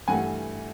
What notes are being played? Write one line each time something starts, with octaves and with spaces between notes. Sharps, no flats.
G2 E3 A3 F#5 G#5